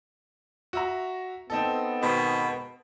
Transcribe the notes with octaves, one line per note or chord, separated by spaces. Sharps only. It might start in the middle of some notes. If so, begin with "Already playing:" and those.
F#4 E5 A#5
B3 C4 D#4 A4
G#2 B2 D#3